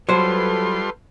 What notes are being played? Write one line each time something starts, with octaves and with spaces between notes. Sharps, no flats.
F#3 G3 F4 A4 B4 C5 C6